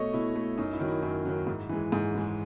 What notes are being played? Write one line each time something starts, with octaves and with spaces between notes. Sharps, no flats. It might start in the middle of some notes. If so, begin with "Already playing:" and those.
Already playing: B2 A3 C#5 D#5
B2 E4
A3
F#2 D#4
E4
D#3 F#3
E4
F#2 E4
D#3 F#3
G#2
E3 G#3
G#2
E3 G#3